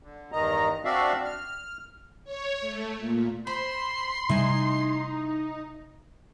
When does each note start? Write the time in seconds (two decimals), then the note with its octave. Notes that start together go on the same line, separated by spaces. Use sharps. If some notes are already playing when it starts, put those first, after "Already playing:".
0.03 D3
0.32 E2 G2 D#3 D#5 A#5
0.85 C4 D4 F#4 D5 E5 F5
1.25 F6
2.24 C#5
2.60 A3
2.98 A#2
3.47 C5 B5 C6
4.29 C3 G3 A3 D#4 E4 G#5